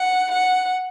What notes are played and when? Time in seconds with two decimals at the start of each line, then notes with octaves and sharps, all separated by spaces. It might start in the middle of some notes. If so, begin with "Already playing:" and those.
Already playing: F#5
0.32 F#5